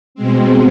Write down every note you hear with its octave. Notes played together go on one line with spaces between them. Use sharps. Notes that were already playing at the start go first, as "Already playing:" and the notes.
B2 G#3 C4